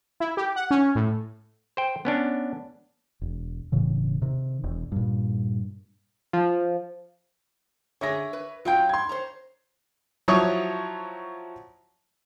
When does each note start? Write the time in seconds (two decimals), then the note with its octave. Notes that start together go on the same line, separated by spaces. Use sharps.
0.20 E4
0.37 G4
0.56 F#5
0.71 C#4
0.95 A2
1.77 C5 G5
2.05 B3 C#4 D4
3.22 E1
3.72 E1 A2 C#3 E3
4.22 C3 D#3
4.64 E1
4.92 G2 A#2
6.33 F3
8.01 D3 G#4 C#5 E5 A#6
8.33 B4
8.65 F#3 F4 F5 G5 G6
8.89 C6 G#6
9.09 C5 C#5 A#5
10.28 F3 F#3 E4 C#5 C#6 D#6